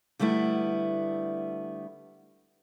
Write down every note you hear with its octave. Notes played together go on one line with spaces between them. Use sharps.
D3 G3 A3 B3 E4